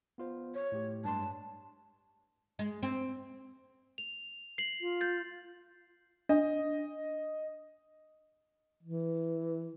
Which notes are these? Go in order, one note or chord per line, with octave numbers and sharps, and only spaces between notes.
B3 F4 C5
C#5
A2 A3 G4
G2 G#3 A5 C6
G#3
C4
F7
C7 F#7
F4
G6 A6
D4 D#5
E3